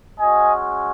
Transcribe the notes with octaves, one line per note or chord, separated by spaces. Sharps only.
G#3 C#4 F#4 D#5 G#5